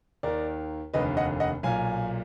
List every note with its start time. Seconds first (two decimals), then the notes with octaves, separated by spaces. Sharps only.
0.23 D#2 D#3 A#4 D5
0.94 F1 D#2 D3 B4 D#5
1.17 D#5 F#5
1.40 D#5 F#5
1.63 B1 A#2 F5 G#5